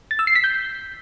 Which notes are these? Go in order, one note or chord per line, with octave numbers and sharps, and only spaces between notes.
A6
E6
C7
B6
G6